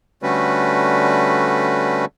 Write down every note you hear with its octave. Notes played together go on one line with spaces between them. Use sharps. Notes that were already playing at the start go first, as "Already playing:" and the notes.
D3 G3 A3 C#4 F#4 B4